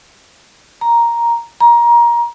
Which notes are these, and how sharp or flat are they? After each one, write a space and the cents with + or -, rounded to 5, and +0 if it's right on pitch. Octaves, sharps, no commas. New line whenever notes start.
A#5 +5
A#5 +20